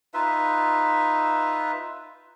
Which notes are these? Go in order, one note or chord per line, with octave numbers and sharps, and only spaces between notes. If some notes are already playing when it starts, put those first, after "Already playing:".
D#4 F4 B4 E5